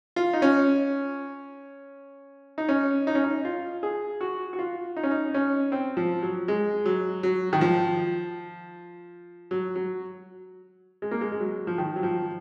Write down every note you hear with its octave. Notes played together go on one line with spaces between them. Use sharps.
F4
D#4
C#4
D#4
C#4
D#4
C#4
D#4
F4
G#4
F#4
F#4
F4
D#4
C#4
D#4
C#4
C4
F3
F#3
G#3
F#3
F#3
D#3
F3
F#3
F#3
G#3
A#3
G#3
G#3
F#3
F3
D#3
F#3
F3